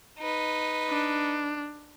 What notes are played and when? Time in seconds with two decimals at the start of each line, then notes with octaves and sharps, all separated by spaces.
0.19 D#4 B4
0.89 D4